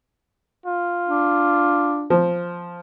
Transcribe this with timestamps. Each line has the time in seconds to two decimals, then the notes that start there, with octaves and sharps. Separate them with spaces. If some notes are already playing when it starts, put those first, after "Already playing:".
0.66 F4
1.09 D4
2.10 F3